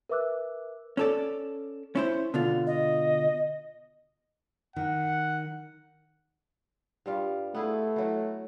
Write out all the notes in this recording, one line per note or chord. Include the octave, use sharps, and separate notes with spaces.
A#4 B4 E5 D6 E6 F#6
C#4 A4 D5
C#4 E4 C5
B2 D3 F4
D#5
D#3 F#5
G2 G3 F4
A3 B3 E4 G#4
E3 F#3 F#4